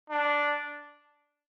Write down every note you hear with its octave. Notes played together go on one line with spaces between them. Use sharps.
D4